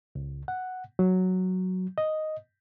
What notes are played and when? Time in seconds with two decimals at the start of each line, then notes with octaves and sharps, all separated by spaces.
0.15 C#2
0.48 F#5
0.99 F#3
1.98 D#5